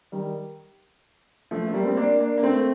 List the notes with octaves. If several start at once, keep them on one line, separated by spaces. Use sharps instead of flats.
D#3 G3
F3 A3
A3
G3 A#3
C4
A#3 D4
A#3 D4
A#3
A3 C4